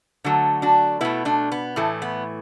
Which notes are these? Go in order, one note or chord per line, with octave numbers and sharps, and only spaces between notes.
D3 F#3 A3
D4 F#4
B2 A3 B3 E4
A3 D4
B3
A2 E3 A3
B3